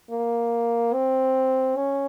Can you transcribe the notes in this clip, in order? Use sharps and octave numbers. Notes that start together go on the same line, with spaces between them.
A#3
C4
C#4